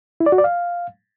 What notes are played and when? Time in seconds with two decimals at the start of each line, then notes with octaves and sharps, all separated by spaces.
0.20 E4
0.26 D5
0.32 F#4
0.38 D5
0.44 F5